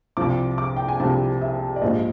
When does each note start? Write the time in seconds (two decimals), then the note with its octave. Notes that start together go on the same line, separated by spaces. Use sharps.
0.17 C2 C3 F3 D6
0.58 D6
0.76 G5
0.88 G#5
1.00 C2 C3 F3 A5
1.41 E5
1.76 D5
1.81 A#1 G#2 F3 D#5